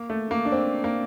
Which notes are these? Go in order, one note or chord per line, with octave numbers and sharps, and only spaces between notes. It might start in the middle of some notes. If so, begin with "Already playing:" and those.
Already playing: A#3
A3
A#3
D4
C4
A#3